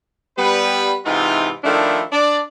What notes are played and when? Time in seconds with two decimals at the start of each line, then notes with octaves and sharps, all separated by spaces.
0.38 G3 B3 B4
1.05 G#2 C3 E3 D#4 F4
1.64 D#3 F3 A3 D4 E4
2.12 D4 D5